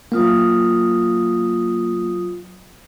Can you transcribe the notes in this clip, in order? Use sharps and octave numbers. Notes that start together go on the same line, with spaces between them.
F#3 A#3 F4 D#6